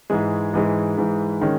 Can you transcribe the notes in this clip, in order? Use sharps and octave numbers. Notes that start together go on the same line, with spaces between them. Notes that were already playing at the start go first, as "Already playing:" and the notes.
G#2 E3 G#3
G#2 E3 G#3
G#2 E3 G#3
D#3 G#3 C#4